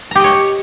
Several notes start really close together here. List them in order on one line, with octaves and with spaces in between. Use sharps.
A#5 G4 D#5 C#5